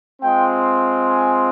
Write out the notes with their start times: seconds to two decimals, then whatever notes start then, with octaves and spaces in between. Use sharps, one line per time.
0.21 G#3 C4 F4 G5
1.06 G#5